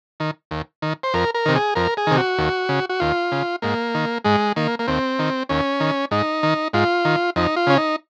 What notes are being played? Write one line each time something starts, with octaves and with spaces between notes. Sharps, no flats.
D#3
D#2
D#3
C5
F2 A#4
A#4
C3 D#3
G#4
F2 A#4
G#4
C3 D#3
F#4
D#2
C#3
F#4
D#2 F4
C#3
G#2 A#3
D#3
G#2 G#3
D#3 A#3
A#3
D#2 C4
D#3
D#2 C#4
D#3
G#2 D#4
D#3
G#2 F4
D#3
F2 D#4
F4
C#3 C#4
D#4